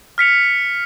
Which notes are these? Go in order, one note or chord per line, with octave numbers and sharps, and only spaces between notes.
F6 B6 C#7 F7